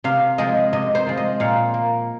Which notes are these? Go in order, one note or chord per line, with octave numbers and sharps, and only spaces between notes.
C3 F5
F3 G#3 D#5
C3 D#5
C5
F3 G#3
D#5
A#2 F5
A#3